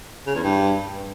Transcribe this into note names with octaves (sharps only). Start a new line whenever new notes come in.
C#3
E2
G2